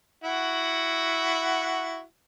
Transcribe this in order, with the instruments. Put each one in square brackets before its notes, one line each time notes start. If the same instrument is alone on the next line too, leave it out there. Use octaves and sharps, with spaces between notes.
[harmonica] E4 F#4 F#5